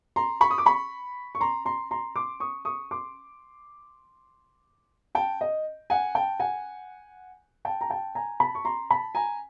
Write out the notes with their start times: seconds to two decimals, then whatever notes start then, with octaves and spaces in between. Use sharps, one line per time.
0.16 A#5 C6
0.41 B5 C#6
0.51 D#6
0.58 D6
0.66 B5 C#6
1.35 C#6
1.41 A#5 C6
1.65 A#5 C6
1.91 A#5 C6
2.16 C6 D6
2.40 C#6 D#6
2.65 C#6 D#6
2.91 C6 D6
5.15 G5 A5
5.41 D#5
5.90 F#5 G#5
6.15 G5 A5
6.40 F#5 G#5
7.65 G5 A5
7.81 A#5
7.90 G5 A5
8.15 G#5 A#5
8.40 A5 B5
8.55 C#6
8.65 A#5 C6
8.90 A5 B5
9.15 G#5 A#5